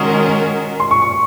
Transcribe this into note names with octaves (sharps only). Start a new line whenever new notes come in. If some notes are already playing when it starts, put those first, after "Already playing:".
Already playing: D#3 G#3 C#4 F#4 A#4 C6 C#6 D#6
C6
C#6
C#6